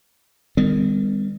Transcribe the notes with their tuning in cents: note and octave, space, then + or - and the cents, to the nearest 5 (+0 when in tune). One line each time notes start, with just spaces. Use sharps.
D#3 -15 G3 +40 B3 +45